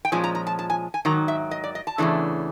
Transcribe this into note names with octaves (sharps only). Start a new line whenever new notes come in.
G5
A#2 F3 G#3 C#4 G#5
A#5
A#5
A5
A5
G#5
G#5
G#2 D#3 F#3 A#5
E5
D#5
D5
D#5
A5
E2 C#3 E3 A3 D4